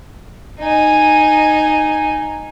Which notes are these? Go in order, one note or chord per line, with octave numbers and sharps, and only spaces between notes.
D#4 G#5